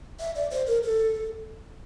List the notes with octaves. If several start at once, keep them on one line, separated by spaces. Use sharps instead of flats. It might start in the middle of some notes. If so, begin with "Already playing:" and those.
E5
D5
C5
A#4
A4